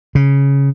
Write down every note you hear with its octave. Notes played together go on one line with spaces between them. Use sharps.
C#3